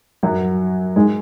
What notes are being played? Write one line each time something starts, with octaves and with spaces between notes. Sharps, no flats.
F#2 F#3
G#2 G#3